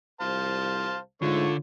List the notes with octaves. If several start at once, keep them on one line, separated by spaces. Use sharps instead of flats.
C2 C5 F5 A5
G#2 D3 A3 F4 C#5